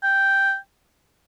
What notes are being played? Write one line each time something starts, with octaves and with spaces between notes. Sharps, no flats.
G5